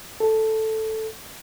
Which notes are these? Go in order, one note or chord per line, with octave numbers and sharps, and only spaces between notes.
A4